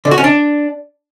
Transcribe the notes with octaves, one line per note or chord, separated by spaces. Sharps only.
D3
F#4
C#4
D4